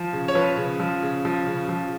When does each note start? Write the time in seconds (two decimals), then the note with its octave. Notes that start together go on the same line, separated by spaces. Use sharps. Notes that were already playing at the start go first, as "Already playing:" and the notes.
Already playing: F3
0.13 C#3
0.28 C#5
0.35 F3 B4
0.57 C#3
0.80 F3
1.02 C#3
1.25 F3
1.47 C#3
1.69 F3